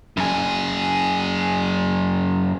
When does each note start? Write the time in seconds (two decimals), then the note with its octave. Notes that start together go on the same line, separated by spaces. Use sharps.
0.17 F#2 G#4